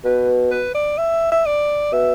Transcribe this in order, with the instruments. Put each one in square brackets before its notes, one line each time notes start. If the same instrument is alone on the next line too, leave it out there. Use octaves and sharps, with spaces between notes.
[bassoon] B2 [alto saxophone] B4
[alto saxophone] B4
D5
E5
E5
D5
[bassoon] B2 [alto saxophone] E5